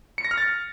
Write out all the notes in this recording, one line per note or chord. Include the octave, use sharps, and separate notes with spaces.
C#7
A#6
F6
A6